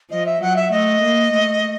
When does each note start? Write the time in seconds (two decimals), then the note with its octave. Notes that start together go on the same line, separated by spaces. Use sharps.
0.11 F3 D#5
0.26 E5
0.41 F#3 F#5
0.56 E5
0.71 A3 D#5
1.02 A#3
1.32 A3